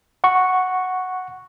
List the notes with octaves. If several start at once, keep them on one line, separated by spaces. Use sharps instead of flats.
F#5 C#6